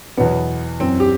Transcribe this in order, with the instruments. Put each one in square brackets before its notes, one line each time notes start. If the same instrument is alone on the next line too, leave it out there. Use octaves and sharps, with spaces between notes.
[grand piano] E2 B2 F#3 B3
F#2 E3 C4
G4